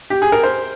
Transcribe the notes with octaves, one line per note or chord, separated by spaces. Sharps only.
G4
G#4
A#4
C5